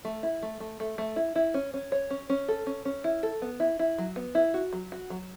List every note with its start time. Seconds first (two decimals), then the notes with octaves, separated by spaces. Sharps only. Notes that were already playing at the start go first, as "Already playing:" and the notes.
0.05 A3
0.23 E4
0.42 A3
0.60 A3
0.80 A3
0.98 A3
1.16 E4
1.35 E4
1.54 C#4
1.74 C#4
1.92 C#5
2.10 C#4
2.29 C#4
2.48 A4
2.66 C#4
2.85 C#4
3.04 E4
3.23 A4
3.42 B3
3.60 E4
3.79 E4
3.98 F#3
4.16 B3
4.35 E4
4.54 F#4
4.73 F#3
4.92 F#4
5.10 F#3